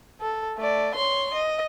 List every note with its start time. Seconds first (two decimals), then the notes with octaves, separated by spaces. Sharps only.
0.21 A4
0.58 A3 D5
0.95 C#5 C6
1.34 D#5